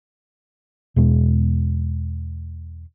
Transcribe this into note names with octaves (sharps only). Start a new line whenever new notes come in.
E2 B2 G#3